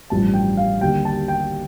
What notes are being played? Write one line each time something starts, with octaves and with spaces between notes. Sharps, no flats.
A1 G2 F3 A3 A5
G5
F5
D#2 D3 G3 G5
A5
G5